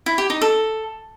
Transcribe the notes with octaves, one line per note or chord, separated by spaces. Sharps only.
E4
G4
D#4
A4